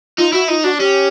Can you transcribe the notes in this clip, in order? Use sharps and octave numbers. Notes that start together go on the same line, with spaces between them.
D#4 F4
E4 F#4
D#4 F4
D4 F#4
C#4 G4